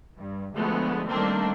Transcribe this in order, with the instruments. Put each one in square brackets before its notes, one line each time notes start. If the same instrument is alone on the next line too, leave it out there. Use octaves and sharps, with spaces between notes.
[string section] G2
D2 F3 G#3 A3 B3
D#3 G3 A3 A#3 C4 D4